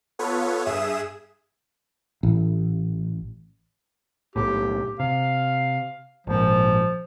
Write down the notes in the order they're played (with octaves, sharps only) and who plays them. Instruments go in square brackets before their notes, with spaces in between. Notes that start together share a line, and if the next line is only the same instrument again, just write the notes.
[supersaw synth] B3 F4 A4 B4 C#5
G2 G#4 E5 D#6 E7
[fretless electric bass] A1
[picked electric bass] B1 A2 [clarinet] G4
[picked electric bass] C3 [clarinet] F5
[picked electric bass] G#1 A#2 [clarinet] F3